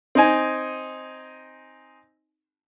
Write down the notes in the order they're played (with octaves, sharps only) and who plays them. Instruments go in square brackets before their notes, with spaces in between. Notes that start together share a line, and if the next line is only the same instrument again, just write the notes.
[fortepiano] C4 D#4 G#5